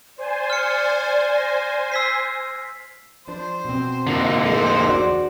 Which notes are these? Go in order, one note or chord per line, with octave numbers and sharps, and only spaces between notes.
C5 D5 G#5
F6 C#7
A#6
E6 B6 C7
F3 D4 C5
B2 C4
D3 A#3
F3 G#3 A3 C5
E2 F#4 D5